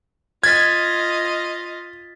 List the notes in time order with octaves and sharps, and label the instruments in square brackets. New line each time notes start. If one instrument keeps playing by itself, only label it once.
[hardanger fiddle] F4 D#5 [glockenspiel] F6 A6 B6 [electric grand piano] G#6